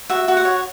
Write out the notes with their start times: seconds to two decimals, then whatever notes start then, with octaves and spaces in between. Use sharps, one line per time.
0.10 F#4 E5
0.28 F#4
0.37 F#5
0.45 C#5